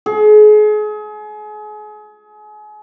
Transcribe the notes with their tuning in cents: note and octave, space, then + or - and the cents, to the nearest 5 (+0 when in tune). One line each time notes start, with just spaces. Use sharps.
G#4 +35